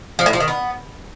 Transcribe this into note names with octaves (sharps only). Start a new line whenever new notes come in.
F3
A2
F3
D#3
B3